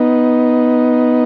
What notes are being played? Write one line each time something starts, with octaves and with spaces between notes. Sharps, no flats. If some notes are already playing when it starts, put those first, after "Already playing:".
Already playing: B3 D#4